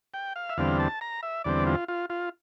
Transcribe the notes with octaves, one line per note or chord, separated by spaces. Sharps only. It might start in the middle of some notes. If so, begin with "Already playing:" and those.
G5
F5
E5
E2 D3 G3 C4 F5
A5
A#5
E5
E2 D3 G3 C4 D5
F4
F4
F4